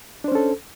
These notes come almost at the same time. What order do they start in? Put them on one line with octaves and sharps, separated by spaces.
D4 C5 C#4 A4